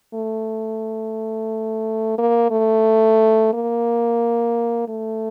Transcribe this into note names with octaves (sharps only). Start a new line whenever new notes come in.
A3
A#3
A3
A#3
A3